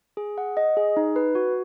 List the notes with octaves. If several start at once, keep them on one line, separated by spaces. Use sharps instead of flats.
G#4
F#5
D#5
G#4
D#4
B4
F#4